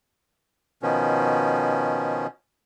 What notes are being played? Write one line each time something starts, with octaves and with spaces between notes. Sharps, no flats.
B2 D#3 F3 C#4